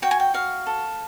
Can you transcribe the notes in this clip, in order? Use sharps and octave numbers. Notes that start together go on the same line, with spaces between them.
F#4 G5
G#5
G5
F#4 F5
A4